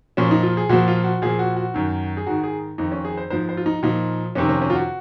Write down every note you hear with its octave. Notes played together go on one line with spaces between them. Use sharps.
A#2 F3 C#4
D#4
F4
G#4
A#2 F3 F#4
F4
F#4
A#2 F3 G#4
F#4
F#4
F#2 D#3
G#4
G#2 D#3 F#4
G#4
F2 D#3 D#4
C#4
G#4
C5
G#2 F3 C5
C5
F4
D#4
A#2 F3 D#4
F2 C3 D#3 C#4
C#4
C#4
F4
F#4